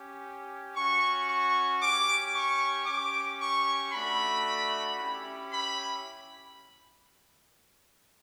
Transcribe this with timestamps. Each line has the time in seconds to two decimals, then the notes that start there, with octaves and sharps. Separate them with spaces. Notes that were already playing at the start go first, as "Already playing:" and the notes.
Already playing: C#4 G4
0.76 C#4 F#4 C#6
1.29 C#6
1.81 C#4 G4 D6
2.35 C#6
2.87 C#4 G4 D6
3.40 C#6
3.93 A3 D4 F#4 B5
4.98 C#4 E4 G4
5.52 B5